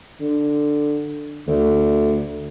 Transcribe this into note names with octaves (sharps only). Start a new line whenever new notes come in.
D3
D2